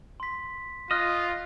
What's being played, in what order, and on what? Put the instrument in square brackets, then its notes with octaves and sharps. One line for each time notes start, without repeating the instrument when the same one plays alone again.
[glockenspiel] C6 B6
[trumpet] F4 [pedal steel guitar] D#5 [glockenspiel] F6 F#6